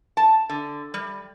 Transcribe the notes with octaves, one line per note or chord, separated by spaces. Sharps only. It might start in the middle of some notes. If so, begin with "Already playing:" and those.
A5
D3
G3